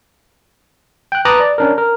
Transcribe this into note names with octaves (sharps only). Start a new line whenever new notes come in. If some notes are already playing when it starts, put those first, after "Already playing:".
G5 F#6
B4 A5 A#5 D6 D#6 F#6
D5
C#4 D4 A#4
A#4